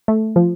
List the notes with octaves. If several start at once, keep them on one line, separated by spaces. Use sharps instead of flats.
A3
F3